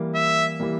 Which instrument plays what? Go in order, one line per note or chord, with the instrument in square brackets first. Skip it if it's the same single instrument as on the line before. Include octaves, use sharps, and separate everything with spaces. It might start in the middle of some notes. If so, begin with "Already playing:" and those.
Already playing: [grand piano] E3 G3 A#3
[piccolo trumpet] E5
[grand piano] E3 G3 A#3